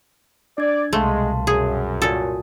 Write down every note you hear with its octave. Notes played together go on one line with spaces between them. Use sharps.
D4 D5 G#6
C2 B2 G#3 A3 F5 A5 C6
F#2 G#4
A#2 F#4 A4 G#5 D#6